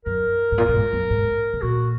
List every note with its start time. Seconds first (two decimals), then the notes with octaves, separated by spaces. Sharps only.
0.05 F#2 A#4
0.52 G#2
0.58 A#2
0.69 A#2
0.76 G#2
0.93 F#2
1.10 G#2
1.53 C#3
1.62 A#2 F#4